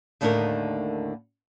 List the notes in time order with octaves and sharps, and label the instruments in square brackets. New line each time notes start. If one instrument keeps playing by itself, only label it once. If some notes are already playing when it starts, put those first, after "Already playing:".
[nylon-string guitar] D#2 A2 D3 A3 D#4 A#4